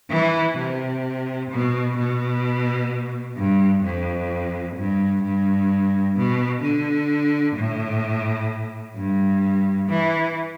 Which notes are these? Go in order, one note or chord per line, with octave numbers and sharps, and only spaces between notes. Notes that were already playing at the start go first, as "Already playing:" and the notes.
E3
C3
B2
B2
G2
F2
G2
G2
B2
D3
A2
G2
E3